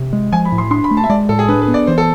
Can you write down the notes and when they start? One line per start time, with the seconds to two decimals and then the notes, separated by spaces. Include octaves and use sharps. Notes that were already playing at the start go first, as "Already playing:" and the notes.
Already playing: C3
0.13 G#3
0.33 F3 G#5
0.45 B5
0.52 A2
0.58 C6
0.71 D4 C6
0.84 B5
0.91 A3
0.97 A5
1.04 E5
1.09 G#3 D5
1.29 A2 A4
1.39 G#4
1.48 D4 B4
1.62 B4
1.68 B3
1.74 D5
1.87 E3 C5
1.98 A4